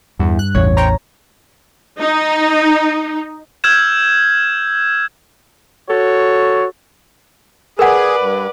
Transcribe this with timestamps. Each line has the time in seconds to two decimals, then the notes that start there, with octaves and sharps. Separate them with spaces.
0.20 E2 G2
0.39 F#6
0.55 A1 E2 C#5
0.77 C5 C#5 G5 A#5
2.00 D#4
3.64 E6 F6 G6 G#6 E7
5.89 F#4 A4 C#5
7.79 G#4 A#4 B4 D5 F#5
8.19 G2